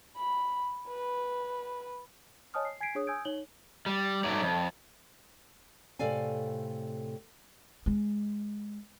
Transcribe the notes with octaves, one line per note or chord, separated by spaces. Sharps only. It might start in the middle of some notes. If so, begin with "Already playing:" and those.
B5
B4
C#5 D#5 G#5 A5 D#6 F6
C7
G#5 G#6 B6 C7 D7
D4 G#4 C#5 D#6
G#5 D#6 E6 G6 G#6 D7
D#4 C#5 F#7 G7
G3
G2 F#3 A3 D#4 D5
F2
A2 C3 A4 D5 F5 G#5
G#3